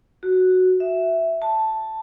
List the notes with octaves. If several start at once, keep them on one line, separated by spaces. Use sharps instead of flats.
F#4
E5
A5